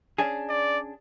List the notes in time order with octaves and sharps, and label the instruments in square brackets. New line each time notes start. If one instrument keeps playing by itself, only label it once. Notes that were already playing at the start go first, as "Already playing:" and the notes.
[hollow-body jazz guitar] C#4 D4 G#4
[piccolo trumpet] D5